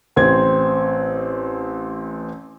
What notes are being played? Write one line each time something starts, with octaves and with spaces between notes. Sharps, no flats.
A1 C4 G#6